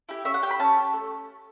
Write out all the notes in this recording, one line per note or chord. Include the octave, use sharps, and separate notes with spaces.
E4 G4
C#4 E5
F#5
G4 G5
B5
C#4 A5
G4
A3